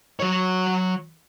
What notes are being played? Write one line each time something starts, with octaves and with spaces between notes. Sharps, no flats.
F#3 C#5